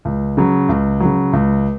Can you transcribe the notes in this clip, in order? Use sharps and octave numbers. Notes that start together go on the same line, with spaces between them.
C#2
C#3 F#3
C#2
C#3 F#3
C#2